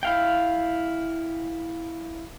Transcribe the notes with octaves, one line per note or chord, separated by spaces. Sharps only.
E4 F5 G5